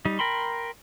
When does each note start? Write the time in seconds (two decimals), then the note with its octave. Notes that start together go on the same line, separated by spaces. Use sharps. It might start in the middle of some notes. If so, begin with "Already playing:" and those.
0.05 G3 D#4
0.19 A#4 G5 B5 C6